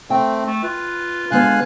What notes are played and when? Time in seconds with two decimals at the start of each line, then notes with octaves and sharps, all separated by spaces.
0.10 A3 C4 G5
0.47 A3
0.63 F4 B4
1.31 D3 G#3 B3 F5 G#5 F#6